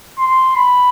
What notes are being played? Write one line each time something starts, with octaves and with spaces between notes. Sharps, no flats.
C6
B5